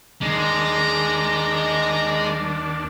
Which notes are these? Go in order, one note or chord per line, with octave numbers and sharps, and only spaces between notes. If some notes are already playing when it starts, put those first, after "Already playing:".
D#2 G#3 D4 A#5